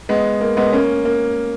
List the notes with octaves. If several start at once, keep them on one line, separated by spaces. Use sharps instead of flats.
G#3 B3
A#3
G#3 B3
A#3 C#4
A#3